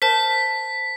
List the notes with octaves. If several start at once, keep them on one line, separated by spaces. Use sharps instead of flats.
A#4 C5 A5 B6